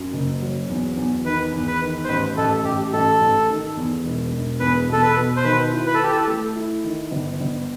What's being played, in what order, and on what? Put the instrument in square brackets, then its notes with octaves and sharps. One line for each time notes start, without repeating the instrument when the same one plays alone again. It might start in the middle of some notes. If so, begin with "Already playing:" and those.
Already playing: [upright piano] F#2
F#1
F#3
E2
E2
[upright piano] D#3 [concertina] B4
[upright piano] E2
[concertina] B4
[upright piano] D#3
[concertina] C5
[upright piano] A1 [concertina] B4
[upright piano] A1 [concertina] A4
[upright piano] A1 [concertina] G4
[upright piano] A1 [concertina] A4
[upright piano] A1
D#3
E2
E1
E1
[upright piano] E2 [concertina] B4
[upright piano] B2 [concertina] A4
[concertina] B4
[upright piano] B2
[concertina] C5
[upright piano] D#3 [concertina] B4
[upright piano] E4
[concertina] B4
A4
[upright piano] E4 [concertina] G4
[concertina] A4
[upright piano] A3
E4
D#3
G1
G1